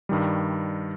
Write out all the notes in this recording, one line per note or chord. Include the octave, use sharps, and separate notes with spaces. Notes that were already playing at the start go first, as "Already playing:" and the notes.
G2 D#3 G3